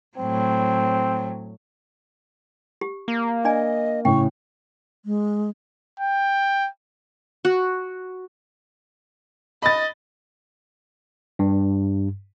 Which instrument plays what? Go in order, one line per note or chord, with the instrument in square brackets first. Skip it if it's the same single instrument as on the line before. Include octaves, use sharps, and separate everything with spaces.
[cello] A2 F#3 [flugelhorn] C4
[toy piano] G4
[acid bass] A#3
[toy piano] D4 D5 G#5 [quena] D#5
[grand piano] A2 C#3 [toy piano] G5 [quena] C#6
[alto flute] G#3
[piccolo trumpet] G5
[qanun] F#4
[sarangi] D#5 [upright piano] B5 A6
[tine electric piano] G2